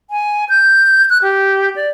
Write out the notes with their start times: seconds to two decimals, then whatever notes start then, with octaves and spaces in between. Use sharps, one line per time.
0.10 G#5
0.49 G6
1.10 F#6
1.23 G4
1.76 D5